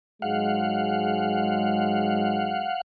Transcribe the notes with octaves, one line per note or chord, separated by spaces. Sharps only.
G#2 F#3 G#3 F5 F#5